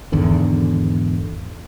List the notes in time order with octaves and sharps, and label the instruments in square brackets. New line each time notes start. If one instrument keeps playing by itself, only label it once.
[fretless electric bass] G#1 E2 D3 D#3